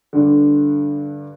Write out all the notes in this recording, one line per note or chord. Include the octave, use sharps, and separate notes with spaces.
G2 D3